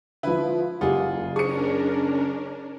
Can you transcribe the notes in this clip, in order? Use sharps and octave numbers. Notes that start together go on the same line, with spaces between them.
D3 F3 E4 B4
F#1 F4 G4 G#4 F#5
C#4 D4 G#4 A#4 C5 C#6 C#7